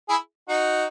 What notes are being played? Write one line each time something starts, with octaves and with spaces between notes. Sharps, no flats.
E4 G#4
D#4 F#4